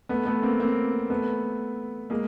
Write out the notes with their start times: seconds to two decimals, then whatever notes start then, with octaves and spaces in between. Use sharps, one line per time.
0.09 A3 B3
0.26 A3 B3
0.42 A#3 C4
0.60 A#3 C4
1.10 A3 B3
2.10 G#3 A#3